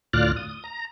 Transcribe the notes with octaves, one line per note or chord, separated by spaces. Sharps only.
D2 A2 F4 D5 F6 F#6
D#6
A#5